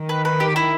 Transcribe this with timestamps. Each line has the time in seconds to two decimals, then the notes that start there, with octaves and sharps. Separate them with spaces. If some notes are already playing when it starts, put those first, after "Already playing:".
Already playing: D#3
0.09 B4
0.25 B4
0.40 G4
0.56 E4